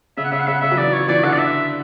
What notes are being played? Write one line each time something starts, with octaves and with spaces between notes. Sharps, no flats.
C#3 E5
F#5
C#3 E5
F#5
C#3 E5
F#5
C#3 E5
F#3
E3 D5
C#5
E3 D5
D3 F#5
D5
E5